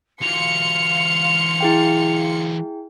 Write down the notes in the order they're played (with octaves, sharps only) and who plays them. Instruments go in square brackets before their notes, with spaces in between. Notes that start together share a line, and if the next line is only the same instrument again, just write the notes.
[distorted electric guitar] E3 F#3 [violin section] F5 C6 C#7 [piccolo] F7
[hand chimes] E4 G#4 G5